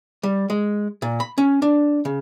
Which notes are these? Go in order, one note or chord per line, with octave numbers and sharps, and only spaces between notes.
G3
G#3
A#2
B5
C#4
D4
C#3